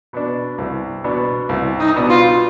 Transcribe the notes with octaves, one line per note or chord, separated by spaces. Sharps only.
B2 B3 D4
C2
B2 B3 D4
C2
D#4
B2 B3 D4
F4